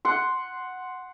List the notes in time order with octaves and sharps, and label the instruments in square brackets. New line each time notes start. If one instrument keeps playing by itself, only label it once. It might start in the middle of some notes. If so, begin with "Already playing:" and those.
[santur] F#5 C6